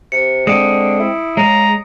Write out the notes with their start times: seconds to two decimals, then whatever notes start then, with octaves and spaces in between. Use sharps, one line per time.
0.12 C3 C#7
0.47 D3 G#3 C4 D#6 C#7 D7
0.99 E4
1.37 C#3 G#3 A#5